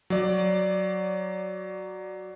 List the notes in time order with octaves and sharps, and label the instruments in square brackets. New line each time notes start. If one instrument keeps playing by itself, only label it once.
[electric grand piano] F#3 D5